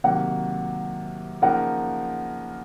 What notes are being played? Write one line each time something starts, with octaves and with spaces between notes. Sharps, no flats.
C3 D#3 F#3 A#3 F#5
C#3 F3 A#3 D#4 A#4 F#5